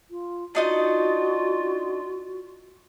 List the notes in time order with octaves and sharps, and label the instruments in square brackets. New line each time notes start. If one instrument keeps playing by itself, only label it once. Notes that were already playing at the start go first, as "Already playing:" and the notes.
[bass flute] F4
[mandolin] D4 D#4 D#5 [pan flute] F4 [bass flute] F#4